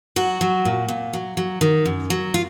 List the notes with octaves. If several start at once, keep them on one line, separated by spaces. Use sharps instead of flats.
F#3 F#4
F#3
A#2
A#2
F#3
F#3
D#3
F#2
F#3
F4